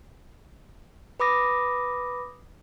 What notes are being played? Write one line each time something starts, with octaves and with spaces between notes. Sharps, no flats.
B4 B5 D6 D#6 A#6